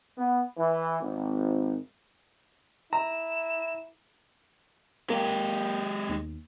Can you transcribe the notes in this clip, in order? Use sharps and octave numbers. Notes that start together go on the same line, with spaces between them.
B3
E3
G#1
E4 A#5 E7
G#3 A#3 G4
D#2